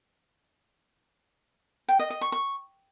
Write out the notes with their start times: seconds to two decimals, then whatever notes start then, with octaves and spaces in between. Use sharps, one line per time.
1.88 G5
1.99 D#5
2.10 D#5
2.21 C#6
2.32 C#6